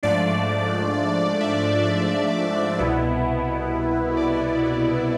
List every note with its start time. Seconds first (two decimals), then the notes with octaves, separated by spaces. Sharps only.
0.03 G#2 F3 A3 D4 D5
1.41 E5
2.79 C2 B2 B3 E4
4.17 D5